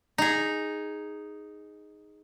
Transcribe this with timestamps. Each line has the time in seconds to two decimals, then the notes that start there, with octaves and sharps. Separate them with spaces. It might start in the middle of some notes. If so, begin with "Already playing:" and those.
0.18 D#4 G#4